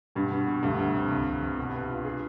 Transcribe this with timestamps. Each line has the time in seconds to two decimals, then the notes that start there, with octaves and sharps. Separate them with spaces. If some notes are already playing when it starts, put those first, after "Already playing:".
0.15 G2 B2
0.31 B2
0.47 B2
0.63 D2 G2
0.79 D2
0.94 C3
1.10 C2
1.26 C2
1.42 C2
1.57 B2
1.74 B4
1.90 F4
2.05 G#4